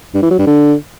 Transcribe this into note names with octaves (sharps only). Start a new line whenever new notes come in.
G2
E3
F#3
G2
D3